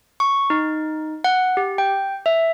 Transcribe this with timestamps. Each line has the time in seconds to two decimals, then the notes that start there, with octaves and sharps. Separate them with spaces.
0.20 C#6
0.50 D#4
1.24 F#5
1.57 G4
1.78 G5
2.26 E5